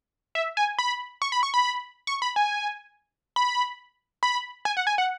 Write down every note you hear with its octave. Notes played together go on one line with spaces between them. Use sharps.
E5
G#5
B5
C#6
B5
C#6
B5
C#6
B5
G#5
B5
B5
G#5
F#5
G#5
F#5